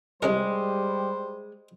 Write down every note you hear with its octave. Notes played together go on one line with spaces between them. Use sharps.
C2 G3 G#3 C#4 A#4 C5